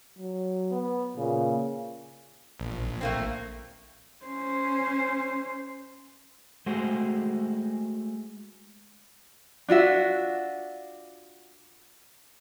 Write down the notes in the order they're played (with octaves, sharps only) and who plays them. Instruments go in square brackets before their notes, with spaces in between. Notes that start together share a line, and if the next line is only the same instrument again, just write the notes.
[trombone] F#3
[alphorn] B3
[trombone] A#2 [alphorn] C#3
[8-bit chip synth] A#1
[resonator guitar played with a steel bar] A3 A#3 C4
[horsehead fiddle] C#4 C5
[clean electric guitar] G#3 A3 F#4 G#4 C5
[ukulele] D4 F4 F#4 E5